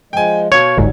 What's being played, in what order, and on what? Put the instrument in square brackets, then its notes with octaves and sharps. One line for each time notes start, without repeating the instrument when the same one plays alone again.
[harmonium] F3 G#3 [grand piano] G5 G#5
[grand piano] B2 G#6 [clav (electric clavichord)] C#5 [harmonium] F5
[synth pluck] G1 C#2 G#2 [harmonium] F#3 G3